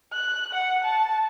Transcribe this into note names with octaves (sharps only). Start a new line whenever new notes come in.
F#6
F#5
A5